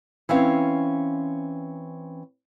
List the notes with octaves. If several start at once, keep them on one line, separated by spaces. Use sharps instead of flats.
E3 C4 C#4 F5